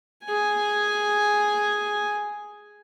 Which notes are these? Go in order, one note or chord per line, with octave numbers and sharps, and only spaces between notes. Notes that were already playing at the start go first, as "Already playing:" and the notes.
G#4 G#5